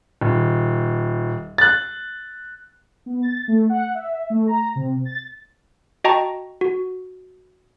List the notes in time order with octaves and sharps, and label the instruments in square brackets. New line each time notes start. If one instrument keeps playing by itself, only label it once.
[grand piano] D#1
F#6 A6
[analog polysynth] B3
A6
A3
F#5
E5
A3
A#5
C3
A6
[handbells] F#4 D#5 G5 A5 A#5 C#6
F#4